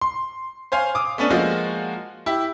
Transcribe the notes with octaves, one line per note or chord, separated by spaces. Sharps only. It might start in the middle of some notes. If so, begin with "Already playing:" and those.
C6
C5 C#5 F5 G#5
D6 D#6
A3 B3 C#4 D4
F3 G#3 A#3 F4 F#4
E4 G4